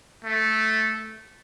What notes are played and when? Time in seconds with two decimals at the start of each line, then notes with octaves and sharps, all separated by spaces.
0.24 A3